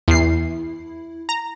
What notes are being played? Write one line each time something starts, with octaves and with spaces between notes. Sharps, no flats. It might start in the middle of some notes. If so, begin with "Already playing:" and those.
E2 E4 C7
A#5